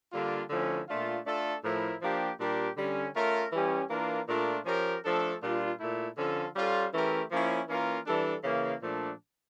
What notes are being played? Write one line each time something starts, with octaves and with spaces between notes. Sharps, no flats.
D3 G3 A#3 D4 F4
D3 F3 A3 C#4 E4
A#2 A3 D4 F4
A3 D4 F4 A4
A2 F3 A3 E4 A#4
F3 A#3 D4 G4
A#2 G3 D4 G4 A#4
D3 G3 C#4
A3 C#4 F4 A#4
E3 G3 C#4 G4
E3 A#3 D4 F4 A#4
A#2 A3 D4 F4 A#4
F3 C#4 G4 A#4
F3 A3 D4 A4
A#2 G3 D4 F4
A#2 A3 E4
D3 F3 C#4 F4 A4
G3 C#4 F4 A4
E3 A3 C#4 G4 A#4
F3 A#3 C#4 E4
E3 A#3 C#4 F4 A#4
E3 G3 D4 A4
C#3 E3 A#3
A#2 F3 A3 D4